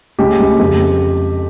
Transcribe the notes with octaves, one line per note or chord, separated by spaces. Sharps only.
C#2 G4
C#2
F2